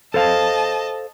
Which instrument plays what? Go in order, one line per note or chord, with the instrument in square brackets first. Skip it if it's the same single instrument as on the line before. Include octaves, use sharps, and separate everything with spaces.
[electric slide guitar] A4 C5 F5 [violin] D#5 A5